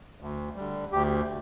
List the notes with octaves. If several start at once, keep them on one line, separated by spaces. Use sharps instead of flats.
D2
D3 G3
D2 G4